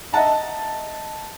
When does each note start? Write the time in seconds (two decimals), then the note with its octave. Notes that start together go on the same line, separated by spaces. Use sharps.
0.13 D#5 E5 F#5 A5 A#5